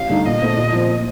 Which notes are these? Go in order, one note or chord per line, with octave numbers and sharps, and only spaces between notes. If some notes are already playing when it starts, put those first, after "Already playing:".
Already playing: A1 F5
G2 D3 A3 D#4
A#2 D#5
A3 C4
A#2
F3 C4